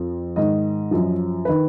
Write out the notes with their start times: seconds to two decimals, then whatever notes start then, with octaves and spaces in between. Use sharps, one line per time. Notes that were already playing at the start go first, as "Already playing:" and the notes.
Already playing: F2 F3
0.36 G#2 D#3 D#5
0.91 F#2 F3
1.45 D#3 B4